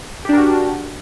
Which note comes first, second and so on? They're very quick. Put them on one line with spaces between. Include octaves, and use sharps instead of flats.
G4 D4 A#4 F#4